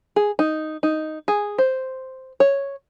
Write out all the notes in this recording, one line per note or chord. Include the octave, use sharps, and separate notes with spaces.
G#4
D#4
D#4
G#4
C5
C#5